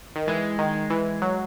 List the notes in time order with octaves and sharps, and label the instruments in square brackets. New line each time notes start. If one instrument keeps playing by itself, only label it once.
[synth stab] D#3
[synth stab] E3 [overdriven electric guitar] G#3
[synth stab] D#3
E3
F#3